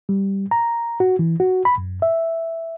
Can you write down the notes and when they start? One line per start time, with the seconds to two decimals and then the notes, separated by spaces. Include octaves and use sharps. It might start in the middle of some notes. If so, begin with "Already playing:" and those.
0.09 G3
0.51 A#5
1.00 F#4
1.19 E3
1.40 F#4
1.65 B5
1.78 F#2
2.02 E5